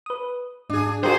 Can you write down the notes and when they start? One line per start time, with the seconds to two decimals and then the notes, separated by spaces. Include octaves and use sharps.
0.06 B4 D#6
0.70 G#2 D4 G#4
1.03 G3 F4 F#4 G#4 A#4 C5 G5